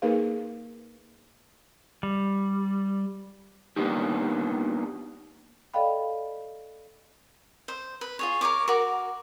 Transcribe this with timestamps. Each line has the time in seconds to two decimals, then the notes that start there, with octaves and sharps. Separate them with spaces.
0.02 A#3 D#4 G#4 A#4 B4 F5
2.03 G3
3.76 G3 A#3 B3 D4 D#4 G4
5.74 A4 D5 D#5 F5 G5 B5
7.68 C5
8.01 B4
8.19 F4 G#4 C#5
8.41 A#4 C#5 C#6 D6
8.68 F#4 A#4 D6